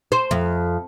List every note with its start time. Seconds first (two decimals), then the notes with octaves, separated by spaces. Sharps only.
0.12 C5
0.31 F2